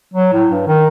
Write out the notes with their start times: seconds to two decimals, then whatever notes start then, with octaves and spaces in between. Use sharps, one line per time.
0.14 F#3
0.33 A2
0.51 G2
0.67 D#3